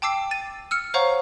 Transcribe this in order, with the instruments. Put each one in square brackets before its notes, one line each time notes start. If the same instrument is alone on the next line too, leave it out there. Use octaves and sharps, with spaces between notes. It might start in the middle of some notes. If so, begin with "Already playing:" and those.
[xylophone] G5 A5 D6 E6 C7
A6 D#7
E6 F6 C#7
C5 C#5 F5 F#5 A#5 C#6